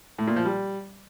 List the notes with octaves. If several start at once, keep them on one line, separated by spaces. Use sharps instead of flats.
A2
A#2
F3
G3